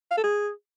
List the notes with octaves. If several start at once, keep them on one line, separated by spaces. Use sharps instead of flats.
F5
A4
G#4